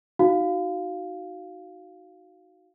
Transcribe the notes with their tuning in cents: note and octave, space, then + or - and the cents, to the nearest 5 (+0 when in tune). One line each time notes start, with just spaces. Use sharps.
D#4 +20 F#4 +0 F5 +0